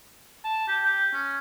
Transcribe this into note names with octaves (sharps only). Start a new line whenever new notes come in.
A5
G4
G4
C#4